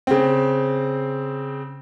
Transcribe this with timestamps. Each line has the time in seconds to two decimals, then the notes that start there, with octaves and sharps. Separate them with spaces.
0.07 C#3 C4